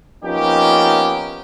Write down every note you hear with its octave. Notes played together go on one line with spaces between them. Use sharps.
F3 A#3 B3 C#4 D#4 G4